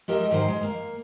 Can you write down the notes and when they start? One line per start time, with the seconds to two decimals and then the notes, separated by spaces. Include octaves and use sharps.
0.08 G#3 G4 A#4 D#5 E5
0.30 D#2 G#2 D#3 F#3 C5
0.48 G#3
0.63 A#3